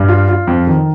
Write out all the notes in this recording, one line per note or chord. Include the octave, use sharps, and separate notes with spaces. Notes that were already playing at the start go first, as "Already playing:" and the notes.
Already playing: G2
F4
F4
F2
D#3